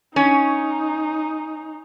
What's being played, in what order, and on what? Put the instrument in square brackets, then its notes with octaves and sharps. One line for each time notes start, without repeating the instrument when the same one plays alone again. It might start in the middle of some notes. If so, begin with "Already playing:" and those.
[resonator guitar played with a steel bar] C#4 [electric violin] D#4